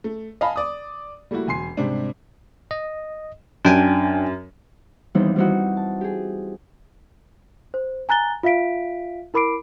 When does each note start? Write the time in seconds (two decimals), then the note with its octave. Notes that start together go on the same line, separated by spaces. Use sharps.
0.04 A3
0.41 D#5 F5 G#5 A5 B5
0.56 D5 D#6
1.31 G3 A3 A#3 E4 F#4
1.48 E1 G#5 C6 C7
1.77 G#2 C3 G3 C4 D4
2.71 D#5
3.65 F#2 D4 G5 G#5
5.14 D#2 E3 G3 B3 C4 D#4
5.36 G3 B3 C4 D#4 E4 F#4
5.77 A5
6.01 G4 G#4
7.74 C5
8.09 G#5 A#5 F#6 A6 G7
8.43 F4 E5 F5 B6 D7
9.34 E4 A#4 B5 D6 C7 D7